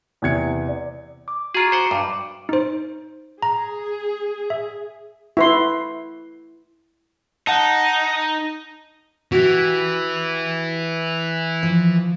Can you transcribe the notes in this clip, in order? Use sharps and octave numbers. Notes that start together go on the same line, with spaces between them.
E2 C3 G#6 C#7
D5
D6
F4 F#4 G#4 A#5 D7
C5 F#5
G2 D6
D#4 C5
G#4 A#5
E5
E4 B4 C6
D#4 F#5 A5
E3 F#4 G4
F3